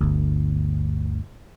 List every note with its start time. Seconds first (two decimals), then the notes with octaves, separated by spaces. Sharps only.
0.01 G1 D2